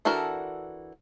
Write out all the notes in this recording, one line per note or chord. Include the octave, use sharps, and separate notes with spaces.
E3 D4 F#4 A4 A#4